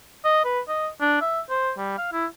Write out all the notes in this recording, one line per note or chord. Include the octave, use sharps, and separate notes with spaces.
D#5
B4
D#5
D4
E5
C5
G3
F5
E4